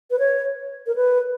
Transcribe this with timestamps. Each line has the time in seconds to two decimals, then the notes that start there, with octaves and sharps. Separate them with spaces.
0.11 B4
0.19 C#5
0.87 A#4
0.96 B4